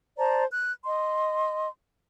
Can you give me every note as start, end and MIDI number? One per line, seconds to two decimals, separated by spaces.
0.18 0.44 72
0.18 0.44 74
0.18 0.44 81
0.18 0.44 82
0.52 0.72 90
0.84 1.68 75
0.84 1.68 84